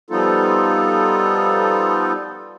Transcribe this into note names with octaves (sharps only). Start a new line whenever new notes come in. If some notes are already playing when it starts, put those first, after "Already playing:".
F3 G3 B3 D#4 F4 A4